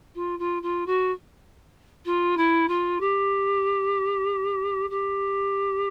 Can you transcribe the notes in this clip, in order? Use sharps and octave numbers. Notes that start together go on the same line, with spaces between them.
F4
F4
F4
F#4
F4
E4
F4
G4
G4